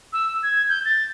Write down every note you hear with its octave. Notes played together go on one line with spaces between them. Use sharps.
E6
G#6
G6
A6